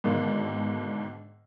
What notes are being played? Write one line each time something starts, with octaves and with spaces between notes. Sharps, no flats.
G#2 B2 D3 D#3 A#3